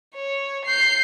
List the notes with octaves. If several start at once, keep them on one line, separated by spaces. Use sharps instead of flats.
C#5
G6 C7